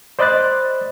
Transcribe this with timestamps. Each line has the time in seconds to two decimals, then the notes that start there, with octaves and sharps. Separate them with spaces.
0.19 C5 D5 D#5 B5 F#6 A6